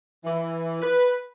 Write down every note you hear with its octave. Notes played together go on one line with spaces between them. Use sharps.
E3
B4